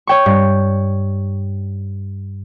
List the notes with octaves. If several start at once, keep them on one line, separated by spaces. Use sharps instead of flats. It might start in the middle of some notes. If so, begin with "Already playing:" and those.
C#5 G5 C#6
G2